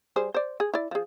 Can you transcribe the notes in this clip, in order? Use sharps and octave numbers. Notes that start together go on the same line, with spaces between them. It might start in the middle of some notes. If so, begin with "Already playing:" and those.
G3 G#4 C5
C5 D5
G#4
E4 D5
F3 G#4